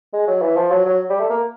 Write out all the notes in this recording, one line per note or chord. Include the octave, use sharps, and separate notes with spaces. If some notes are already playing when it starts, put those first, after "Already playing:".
G#3
F#3
E3
F3
F#3
F#3
G3
A3
A#3